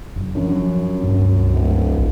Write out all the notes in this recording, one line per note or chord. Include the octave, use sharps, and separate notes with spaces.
F#1
F#2 F3 C#4 D4
C#2 G2 C#4
D1
A#1